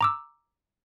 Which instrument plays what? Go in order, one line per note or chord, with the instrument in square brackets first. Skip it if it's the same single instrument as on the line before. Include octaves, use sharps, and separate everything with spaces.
[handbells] A#5 D6 E6